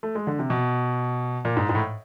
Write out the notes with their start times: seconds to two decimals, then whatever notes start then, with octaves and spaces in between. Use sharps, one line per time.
0.03 A3
0.15 G#3
0.27 D3
0.39 C3
0.50 B2
1.45 A#2
1.57 G#2
1.69 G#2
1.75 A2